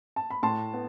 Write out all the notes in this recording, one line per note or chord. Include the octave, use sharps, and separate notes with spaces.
A5
B5
A2 A5 C6
B3